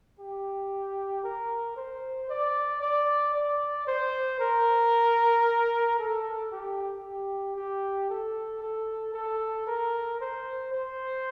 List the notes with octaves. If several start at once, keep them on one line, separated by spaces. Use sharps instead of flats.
G4
A#4
C5
D5
D5
D5
C5
A#4
A4
G4
G4
G4
A4
A4
A4
A#4
C5
C5